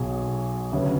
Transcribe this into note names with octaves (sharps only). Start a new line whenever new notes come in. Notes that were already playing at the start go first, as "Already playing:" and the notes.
Already playing: B1 B2 F#3 G#4
D2 C#3 F#3 B3 C#5